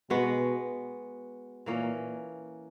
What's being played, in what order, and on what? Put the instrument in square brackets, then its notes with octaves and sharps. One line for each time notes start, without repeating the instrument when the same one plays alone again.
[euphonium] B2 [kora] G#3 B3 F#4
[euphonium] A#2 [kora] E3 A#3 C#4